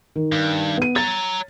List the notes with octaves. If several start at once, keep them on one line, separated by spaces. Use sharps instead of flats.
D#3
G2
B3 D#7
C#5 A#5 A6